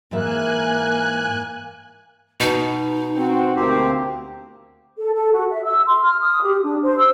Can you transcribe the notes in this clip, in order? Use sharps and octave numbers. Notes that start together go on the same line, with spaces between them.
G#2 E3 A#3 E5 G#5 F#6
B2 D#4
C4 F#4
D2 A#3 C4 G4
A4
A4
F#4
E5
E6
C6
F6
D#6
G4
D4
C5
E6